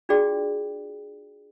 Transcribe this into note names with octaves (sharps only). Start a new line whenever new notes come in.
D4 F4 F#4 G#4 D5 G5